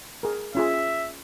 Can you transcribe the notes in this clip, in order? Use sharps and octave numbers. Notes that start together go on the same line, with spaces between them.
G#4 A#4
C#4 F4 G#4 E5